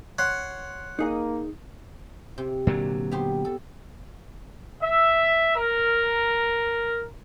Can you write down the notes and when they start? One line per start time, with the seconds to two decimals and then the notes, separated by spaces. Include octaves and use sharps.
0.19 C#5 F#5 C6
0.99 A#3 D#4 G#4 D#5
2.38 C3
2.67 A#2 D3 F#3
3.12 B3 G4 C5
3.45 A4
4.83 E5
5.55 A#4